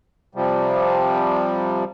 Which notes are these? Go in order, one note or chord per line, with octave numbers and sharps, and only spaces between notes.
C3 F3 G3